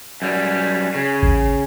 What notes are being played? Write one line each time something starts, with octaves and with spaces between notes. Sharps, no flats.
F#2 G3
C#3
A1